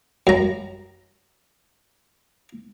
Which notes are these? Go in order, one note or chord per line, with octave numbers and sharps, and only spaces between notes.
F#2 A#5